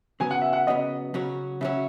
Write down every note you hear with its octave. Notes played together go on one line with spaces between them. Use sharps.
C#3 F#3 B3 G#5
F#5
E5
F#5
C#3 F#3 B3 D#5
C#3 F#3 C#4 F#4
C#3 F#3 C#4 F#4 E5